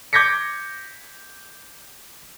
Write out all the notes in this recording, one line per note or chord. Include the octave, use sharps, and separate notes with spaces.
D6 G6 G#6 A#6 B6 C#7